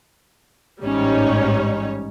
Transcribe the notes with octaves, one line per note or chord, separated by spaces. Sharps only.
A1 G#2 G3 C#4 D#4 C#5